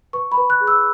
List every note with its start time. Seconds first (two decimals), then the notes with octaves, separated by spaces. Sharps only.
0.13 B4 C#6
0.32 B5
0.37 B4
0.50 F#6
0.61 G#4
0.67 E6